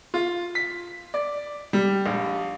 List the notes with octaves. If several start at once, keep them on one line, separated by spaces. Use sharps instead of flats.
F4
B6
D5
G3
A#1